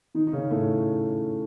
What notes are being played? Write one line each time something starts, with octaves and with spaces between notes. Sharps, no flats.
D#3 D#4
D#4
C#3 C#4
A2 A3